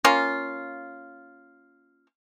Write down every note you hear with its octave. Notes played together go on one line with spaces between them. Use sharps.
A#3 C#4 F4